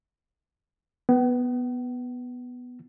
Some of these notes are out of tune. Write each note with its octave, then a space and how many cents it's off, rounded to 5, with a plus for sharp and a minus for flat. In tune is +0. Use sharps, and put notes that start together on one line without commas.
B3 +0 F#5 +45